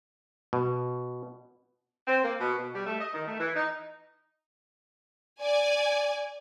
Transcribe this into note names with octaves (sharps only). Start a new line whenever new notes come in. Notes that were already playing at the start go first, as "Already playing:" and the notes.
B2
C4
A#3
B2
B2
G3
A3
D#5
D#3
A3
E3
D#4
D5 G#5